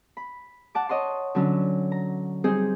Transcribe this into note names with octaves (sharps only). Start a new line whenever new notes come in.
B5
F#5 A5 D6
C#5 D#5 F#5 C6
D3 F#3 C#4 D4
A#5
G3 C4 D#4 G#4 C5